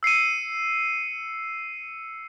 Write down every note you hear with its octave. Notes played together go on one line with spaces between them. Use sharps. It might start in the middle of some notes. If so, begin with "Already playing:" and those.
E6 C7 C#7 D#7